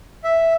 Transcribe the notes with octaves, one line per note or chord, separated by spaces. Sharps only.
E5